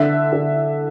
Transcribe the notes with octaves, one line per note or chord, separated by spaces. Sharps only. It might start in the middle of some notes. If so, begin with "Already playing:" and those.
Already playing: D3 E5
D3